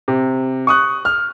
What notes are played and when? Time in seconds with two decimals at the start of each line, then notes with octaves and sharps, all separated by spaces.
0.08 C3
0.67 C#6 D#6 F#6
1.05 F6